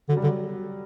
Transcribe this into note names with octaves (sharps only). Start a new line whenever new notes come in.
D3 F#3
G3
D3 F#3